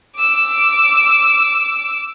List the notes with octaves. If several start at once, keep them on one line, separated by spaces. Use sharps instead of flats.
D6 E6